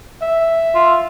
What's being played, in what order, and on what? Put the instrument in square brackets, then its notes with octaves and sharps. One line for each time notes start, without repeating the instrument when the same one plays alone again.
[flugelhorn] E5
[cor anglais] F4